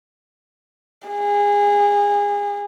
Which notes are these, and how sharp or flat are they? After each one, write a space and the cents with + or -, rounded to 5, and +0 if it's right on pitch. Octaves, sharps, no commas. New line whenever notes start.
G#4 -25